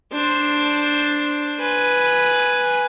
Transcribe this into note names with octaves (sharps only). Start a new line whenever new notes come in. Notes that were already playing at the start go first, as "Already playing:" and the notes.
D4 C5
B4 G#5